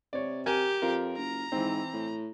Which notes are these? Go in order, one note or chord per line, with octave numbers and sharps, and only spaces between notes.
C3 C#5 D5
G4 A#4 G#5
F2 F4 A#4
F#1 A#5
G#2 E3 C4
A2